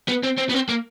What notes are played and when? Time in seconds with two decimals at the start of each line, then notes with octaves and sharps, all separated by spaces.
0.09 B3
0.24 C4
0.38 C4
0.50 B3
0.54 C4
0.69 A#3